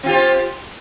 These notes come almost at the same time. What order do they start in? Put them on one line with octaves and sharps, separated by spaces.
C4 F4 G4